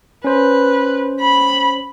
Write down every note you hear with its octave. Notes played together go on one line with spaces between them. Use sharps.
C#4 B4 C5
B5